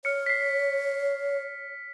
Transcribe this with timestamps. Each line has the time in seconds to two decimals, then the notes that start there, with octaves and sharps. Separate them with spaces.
0.05 C#5 F6 C#7
0.26 B6 C7